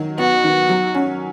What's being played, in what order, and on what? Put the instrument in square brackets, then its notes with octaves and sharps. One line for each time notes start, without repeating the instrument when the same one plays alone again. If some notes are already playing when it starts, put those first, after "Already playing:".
Already playing: [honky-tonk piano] D#3 F#3
[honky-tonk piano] B3 [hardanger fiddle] F#4
[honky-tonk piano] D#3
F#3
C#4